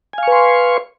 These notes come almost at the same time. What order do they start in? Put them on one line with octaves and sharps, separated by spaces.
G#5 F5 C#6 B4 C6